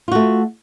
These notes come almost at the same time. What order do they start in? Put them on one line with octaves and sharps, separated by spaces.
F4 F#4 A3